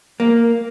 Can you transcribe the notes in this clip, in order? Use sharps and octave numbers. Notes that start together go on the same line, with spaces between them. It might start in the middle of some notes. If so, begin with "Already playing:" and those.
A#3